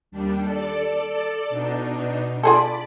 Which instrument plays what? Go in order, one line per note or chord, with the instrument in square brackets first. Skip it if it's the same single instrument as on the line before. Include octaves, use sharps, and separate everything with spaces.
[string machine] D#2 G3 D4
A4 D5
B2 D4 D#4
[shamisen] F4 G#4 A4 [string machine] D5 B5